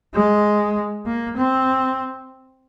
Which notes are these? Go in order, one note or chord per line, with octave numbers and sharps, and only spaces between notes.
G#3
A#3
C4